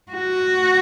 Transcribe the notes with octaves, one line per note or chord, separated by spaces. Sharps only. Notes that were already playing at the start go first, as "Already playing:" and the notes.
F#4